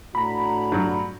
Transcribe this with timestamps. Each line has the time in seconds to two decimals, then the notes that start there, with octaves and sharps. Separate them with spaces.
0.15 A2 D4 F#4 A#5 B5
0.72 G2 F#3